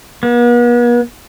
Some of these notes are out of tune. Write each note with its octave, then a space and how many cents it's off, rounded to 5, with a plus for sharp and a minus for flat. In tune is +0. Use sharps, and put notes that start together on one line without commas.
B3 -45